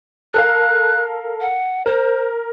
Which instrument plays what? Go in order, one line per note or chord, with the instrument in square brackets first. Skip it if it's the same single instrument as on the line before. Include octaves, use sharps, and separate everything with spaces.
[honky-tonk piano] A4 A#4 F5 [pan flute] F#6
[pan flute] F#5
[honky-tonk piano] A#4 [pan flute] C5